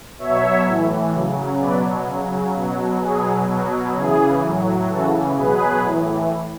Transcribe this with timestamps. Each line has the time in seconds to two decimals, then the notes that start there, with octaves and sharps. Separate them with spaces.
0.19 B2 F#3 C#5 E5
0.66 A2 E3
1.13 C#3 F#3
1.60 B2 F#3 B4 D5
2.07 C#3 F#3
2.54 B2 F#3
3.01 B2 F#3 G#4
3.48 B2 F#3
3.95 C#3 E3 G#4
4.42 A2 F#3
4.89 C#3 E3 F#4 A4
5.36 B2 F#3 G#4 B4
5.82 A2 E3